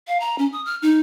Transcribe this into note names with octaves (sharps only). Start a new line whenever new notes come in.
F5
A#5
C#4
D#6
F6
D#4